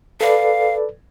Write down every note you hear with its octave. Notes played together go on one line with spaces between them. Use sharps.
A4 B4 D5 F5